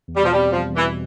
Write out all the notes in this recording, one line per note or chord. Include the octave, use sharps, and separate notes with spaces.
E2
G3
B2 F3
G3 C4
F3 G3
E2
E3
B2